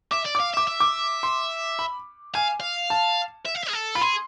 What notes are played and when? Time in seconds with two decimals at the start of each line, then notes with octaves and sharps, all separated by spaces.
0.11 E5 D6
0.25 D5
0.35 F5 D6
0.54 E5 D6
0.67 E5
0.80 D6
1.23 C6
1.79 B5
2.34 F5 G#5
2.60 F5
2.90 A5
3.46 E5
3.55 F5
3.63 E5
3.69 G#4
3.73 A4
3.95 F4 B5
4.01 G#4 C6